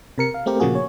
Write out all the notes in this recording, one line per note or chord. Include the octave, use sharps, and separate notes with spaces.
C3 A#4 C#7
F5
A3 C4 G4 A#4
A#2 C#3 F3 A#3 F#4 G#4
C#5